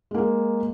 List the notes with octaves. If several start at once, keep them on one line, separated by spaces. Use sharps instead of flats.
G#3 A#3 G#4